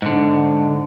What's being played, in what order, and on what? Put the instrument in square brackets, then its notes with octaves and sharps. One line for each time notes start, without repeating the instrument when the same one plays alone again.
[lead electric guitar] G#2 D3